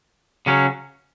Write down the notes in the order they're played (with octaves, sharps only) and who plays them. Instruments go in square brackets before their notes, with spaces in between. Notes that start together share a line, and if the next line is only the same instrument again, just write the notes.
[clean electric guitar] C#3 F#3 C#4